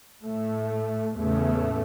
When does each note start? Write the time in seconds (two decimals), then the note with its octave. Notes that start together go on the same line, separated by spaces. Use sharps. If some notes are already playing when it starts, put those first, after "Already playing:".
0.22 A2 A3
1.16 E2 A2 C#3 A3